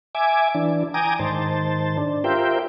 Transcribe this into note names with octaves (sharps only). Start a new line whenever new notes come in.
E5 G#5 D6
E3 D4
G5 G#5 A#5 D6 D#6
G#2 D#3 C5 A5
D4
F4 G4 A#4 C5 E5 G5